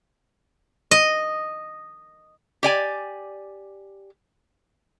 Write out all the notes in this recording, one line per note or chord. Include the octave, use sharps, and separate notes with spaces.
D#5
G4 D5 G#5